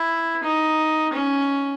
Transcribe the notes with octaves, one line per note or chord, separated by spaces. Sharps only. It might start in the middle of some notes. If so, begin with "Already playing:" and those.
Already playing: E4
D#4
C#4